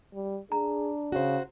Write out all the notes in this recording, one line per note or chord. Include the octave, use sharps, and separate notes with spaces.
G3
D4 G#4 A#5
C#3 F#4 C5